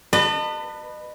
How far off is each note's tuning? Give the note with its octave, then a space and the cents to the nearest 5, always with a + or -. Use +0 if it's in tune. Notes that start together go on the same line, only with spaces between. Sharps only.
B4 +0 D#5 -35 A5 +35